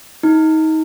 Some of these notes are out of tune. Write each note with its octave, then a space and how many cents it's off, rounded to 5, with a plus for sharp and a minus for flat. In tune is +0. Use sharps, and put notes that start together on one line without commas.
D#4 +30